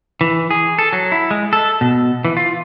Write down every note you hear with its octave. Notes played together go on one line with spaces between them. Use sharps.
E3
G#4
A4
F#3
E4
G#3
A4
B2
E3
F4